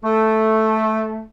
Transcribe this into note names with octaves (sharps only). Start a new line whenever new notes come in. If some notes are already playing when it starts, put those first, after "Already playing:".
A3